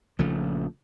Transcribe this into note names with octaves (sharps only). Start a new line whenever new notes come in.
A#1 C#3 F3 A3